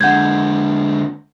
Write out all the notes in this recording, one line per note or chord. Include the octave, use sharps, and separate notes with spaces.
D3 G#3 F#5 G6 G#6